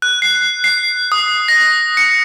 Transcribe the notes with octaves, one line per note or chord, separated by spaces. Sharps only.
F#6
C7
C7
D#6
A#6
C#7